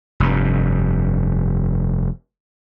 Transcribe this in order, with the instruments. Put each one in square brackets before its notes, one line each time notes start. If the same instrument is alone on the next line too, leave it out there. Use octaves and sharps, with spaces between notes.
[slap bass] F1 G2